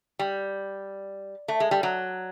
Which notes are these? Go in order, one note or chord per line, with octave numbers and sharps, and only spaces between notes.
G3
A3
G#3
G3
F#3